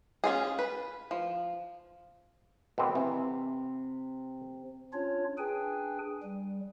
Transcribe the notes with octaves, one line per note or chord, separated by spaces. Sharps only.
C#4 F4 G#4
B4
F3
B2 A#3 C4
C3 E3
C#4 D4 F4 C#5
D4 G#4 B4 G5 G#5
G3